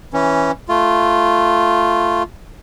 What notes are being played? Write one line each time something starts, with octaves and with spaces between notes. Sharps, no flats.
E3 C#4
A3 F4